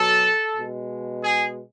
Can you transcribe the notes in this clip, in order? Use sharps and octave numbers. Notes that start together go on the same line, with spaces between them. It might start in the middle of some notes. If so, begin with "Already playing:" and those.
Already playing: B2 F#3 A4
B2 G#3
G#4